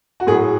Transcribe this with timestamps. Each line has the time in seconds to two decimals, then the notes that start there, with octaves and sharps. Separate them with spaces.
0.20 F#4
0.27 A2 F#3 G#4